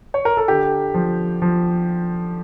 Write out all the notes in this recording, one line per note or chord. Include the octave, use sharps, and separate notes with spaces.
C#5
A#4
A4
D3 G4
F3
F3